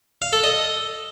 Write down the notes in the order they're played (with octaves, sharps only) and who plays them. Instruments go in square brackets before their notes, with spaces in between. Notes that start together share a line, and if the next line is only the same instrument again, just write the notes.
[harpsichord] F5
A4
D#5